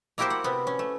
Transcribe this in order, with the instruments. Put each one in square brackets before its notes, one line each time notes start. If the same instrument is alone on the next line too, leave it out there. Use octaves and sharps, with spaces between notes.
[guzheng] A#3 E4 F#4 G4 A#4 C5
F#5
C3 B3
C#4
A3